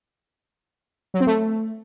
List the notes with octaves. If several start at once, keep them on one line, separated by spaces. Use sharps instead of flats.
F#3
C4
A3